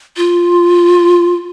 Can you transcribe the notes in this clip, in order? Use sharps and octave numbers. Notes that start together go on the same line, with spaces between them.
F4